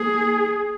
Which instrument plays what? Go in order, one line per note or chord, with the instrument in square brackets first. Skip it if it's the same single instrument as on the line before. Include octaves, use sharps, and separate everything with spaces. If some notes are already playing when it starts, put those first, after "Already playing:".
Already playing: [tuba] A#3 [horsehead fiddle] G#4